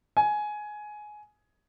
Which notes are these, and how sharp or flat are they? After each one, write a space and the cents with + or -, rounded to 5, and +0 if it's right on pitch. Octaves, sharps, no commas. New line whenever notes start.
G#5 +15